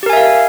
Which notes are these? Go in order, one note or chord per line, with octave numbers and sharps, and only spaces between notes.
G4 A#4 E5 F5 G#5